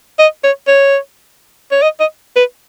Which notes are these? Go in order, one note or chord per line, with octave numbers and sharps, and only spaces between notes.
D#5
C#5
C#5
C#5
D#5
D#5
B4